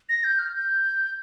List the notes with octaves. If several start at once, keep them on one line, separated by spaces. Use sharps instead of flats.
A#6
G6
F6
G6